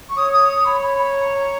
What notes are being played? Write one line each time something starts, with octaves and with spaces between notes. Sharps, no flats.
C#6
C#5 D#6
D#6
D#6
B5
B5
B5
A#5
A#5